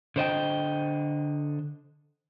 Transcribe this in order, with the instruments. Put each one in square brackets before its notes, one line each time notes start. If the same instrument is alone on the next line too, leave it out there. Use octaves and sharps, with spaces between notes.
[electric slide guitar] D3 C5 D#5 G5